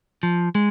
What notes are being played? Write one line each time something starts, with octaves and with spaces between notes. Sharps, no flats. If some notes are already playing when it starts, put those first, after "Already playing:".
F3
G#3